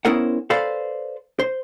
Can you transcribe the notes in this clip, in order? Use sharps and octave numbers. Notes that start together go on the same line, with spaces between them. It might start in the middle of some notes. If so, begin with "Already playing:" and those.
B3 C#4 E4 A#4 C5 F#5
A4 B4 C5 D5 F5
C5